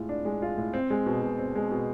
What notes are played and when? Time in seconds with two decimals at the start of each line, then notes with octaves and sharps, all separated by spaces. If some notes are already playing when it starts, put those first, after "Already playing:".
Already playing: A2 G#3 F4
0.09 D4
0.25 G#3
0.42 F4
0.57 A2
0.73 C4
0.90 G#3
1.06 B2
1.22 B2
1.38 C4
1.55 G#3
1.71 B2